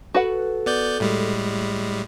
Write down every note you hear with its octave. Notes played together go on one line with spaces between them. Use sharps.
F#4 A4 B4 F#5
B3 D5 G6
A2 G3 G#3